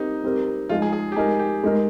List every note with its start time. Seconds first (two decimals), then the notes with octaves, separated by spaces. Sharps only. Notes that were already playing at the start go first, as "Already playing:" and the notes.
Already playing: G3 C4 D#4 G4 A#4
0.24 G3 C4 G4 A#4
0.69 F3 G#3 D#4 F4
0.82 G#4
0.93 G#4
1.12 G4
1.16 G#3 D#4 G#4 A#4
1.39 G4
1.64 G#3 D#4 A#4